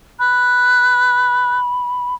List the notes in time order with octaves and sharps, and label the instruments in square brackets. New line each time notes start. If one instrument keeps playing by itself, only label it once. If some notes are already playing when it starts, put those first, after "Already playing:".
[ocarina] B5 [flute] F#6